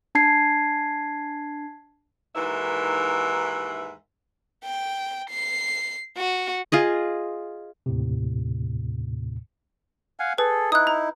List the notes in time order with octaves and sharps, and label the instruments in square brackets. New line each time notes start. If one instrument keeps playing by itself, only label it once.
[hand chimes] D4 A5 G#6 C7
[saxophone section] D#2 G#2 E3 A#4 E5
[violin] G5
C7
F#4
[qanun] F4 G#4 D#5
[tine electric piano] D#2 A2 C3
[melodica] F5 F#5 G#5
[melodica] G#4 A4 [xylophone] B4
[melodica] D#4 E4 [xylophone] D#6 F#6
[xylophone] A#5